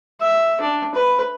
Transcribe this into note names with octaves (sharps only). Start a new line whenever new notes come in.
E5
D4
B4